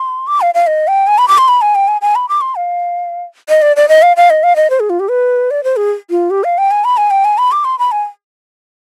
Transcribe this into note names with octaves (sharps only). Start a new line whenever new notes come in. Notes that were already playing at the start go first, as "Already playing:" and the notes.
Already playing: C6
D6
F5
F5
D#5
G5
G#5
B5
D6
C6
B5
G#5
G5
G#5
G#5
B5
D6
C6
F5
D#5
D5
D5
D#5
F5
F5
D#5
F5
D#5
C5
G#4
F4
G4
B4
D5
C5
G#4
F4
G4
F5
G5
G#5
B5
G#5
G5
G#5
B5
D6
C6
B5
G#5